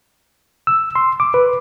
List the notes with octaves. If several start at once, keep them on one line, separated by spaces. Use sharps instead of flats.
E6
C6
D6
B4